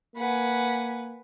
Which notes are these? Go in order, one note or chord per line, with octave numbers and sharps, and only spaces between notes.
A#3 B4 F#5 G#5